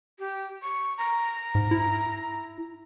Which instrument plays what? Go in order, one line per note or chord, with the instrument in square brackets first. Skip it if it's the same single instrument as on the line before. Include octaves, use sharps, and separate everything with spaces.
[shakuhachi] G4
C#6
A#5
[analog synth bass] G#2
E4